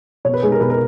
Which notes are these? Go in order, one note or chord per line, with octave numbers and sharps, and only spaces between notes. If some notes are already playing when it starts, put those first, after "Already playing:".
B2 C#5
B4
G#3 D#4 G#4
A#4
B2 B4
A#4